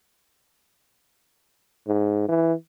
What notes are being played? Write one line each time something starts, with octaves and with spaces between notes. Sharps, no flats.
G#2
E3